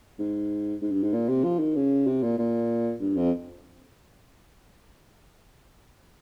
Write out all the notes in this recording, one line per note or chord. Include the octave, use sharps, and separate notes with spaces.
G#2
G#2
G2
G#2
A#2
C3
F3
D#3
C#3
C3
A#2
A#2
G2
F2